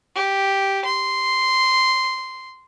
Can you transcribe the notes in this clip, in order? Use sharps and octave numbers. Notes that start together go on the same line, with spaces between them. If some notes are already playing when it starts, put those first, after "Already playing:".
G4
C6